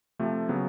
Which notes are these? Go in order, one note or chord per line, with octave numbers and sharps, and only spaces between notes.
C3 F3 A3
C#3 F#3 B3